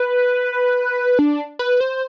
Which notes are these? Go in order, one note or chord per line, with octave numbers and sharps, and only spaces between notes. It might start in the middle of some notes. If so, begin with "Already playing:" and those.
Already playing: B4
D4
B4
C5